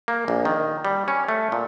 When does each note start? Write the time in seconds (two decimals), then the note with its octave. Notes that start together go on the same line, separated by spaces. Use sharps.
0.08 A#3
0.28 A#1
0.45 D#3
0.85 G3
1.08 C#4
1.29 A3
1.52 A#2